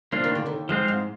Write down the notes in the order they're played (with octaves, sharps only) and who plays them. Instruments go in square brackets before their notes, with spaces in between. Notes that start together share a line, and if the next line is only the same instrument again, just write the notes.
[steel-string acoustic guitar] F3 [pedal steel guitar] A#3 D4 F4
[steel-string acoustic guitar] D#3
D3
D#2 D#3
[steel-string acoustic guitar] G#2 [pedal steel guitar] F3 G#3 C4 F4 C5
[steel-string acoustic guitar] G#2